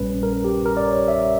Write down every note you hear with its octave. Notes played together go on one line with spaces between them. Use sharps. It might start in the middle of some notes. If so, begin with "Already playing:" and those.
Already playing: A#1 A#2 G3 C#4 B4
A#4
G4
A#4
D5
C#5
E5